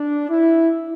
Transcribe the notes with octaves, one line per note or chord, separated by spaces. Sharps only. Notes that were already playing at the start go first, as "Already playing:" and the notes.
Already playing: D4
E4